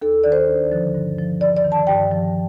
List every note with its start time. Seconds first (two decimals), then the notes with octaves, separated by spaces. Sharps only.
0.02 D#2 A4
0.24 D#3 D5
0.32 C5
0.48 D2
0.72 D3 F3
0.95 G2
1.18 F3
1.41 D#2 D5
1.57 D5
1.64 D#3
1.72 A5
1.87 G2 G5
2.11 F3